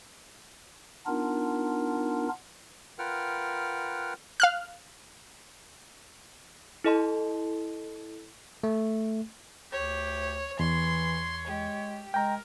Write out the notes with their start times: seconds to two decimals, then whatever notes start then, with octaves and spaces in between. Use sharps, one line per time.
1.06 B3 D4 D#4 F4 A#4
2.99 F4 A#4 B4 F#5 G5 F6
4.40 F5 F6 F#6
6.84 E4 A4 D#5 A5 C6
8.64 A3
9.73 D2 G4 C#5
10.60 E2 E3 C#5 C6
11.47 G#3 G4
12.14 G#3 A#4 G5 A#5